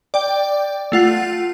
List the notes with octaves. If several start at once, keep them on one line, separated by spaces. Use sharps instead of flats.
D5 G5
A3 F4 F#5